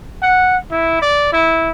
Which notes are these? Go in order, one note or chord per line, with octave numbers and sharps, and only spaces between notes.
F#5
E4
D5
E4